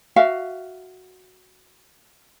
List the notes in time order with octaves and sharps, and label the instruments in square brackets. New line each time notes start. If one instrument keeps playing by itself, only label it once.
[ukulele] F#4 E5 F5